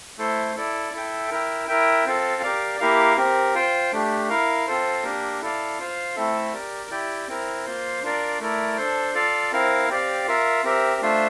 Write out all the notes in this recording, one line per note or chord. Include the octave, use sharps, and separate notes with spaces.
A3 E4 A4 C5
E4 A4 D5
E4 A4 E5 G5
E4 A#4 E5 G5
E4 A#4 E5 G5
C4 F4 A4
G4 A#4 D5 F5
A#3 E4 G4 A#4 F5
C4 G4 A#4
F4 C5 G5
A3 D4 G4
E4 A#4 F5
C4 F4 A4 C5
A#3 D4 G4 A#4
E4 A4 D5 F5
F4 C5 F5
A3 C4 E4 A4 E5
G4 A#4 D5
E4 G4 D5 G5
C4 E4 A#4
A#3 F4 C5
D4 F4 A#4 D5
A3 E4 A#4 D5
D4 A4 C5
F4 A4 D5 F5
C4 E4 A#4 F5
C4 G4 D5 F5
F4 A#4 E5
C4 G4 A#4 E5
A3 D4 F4 C5 E5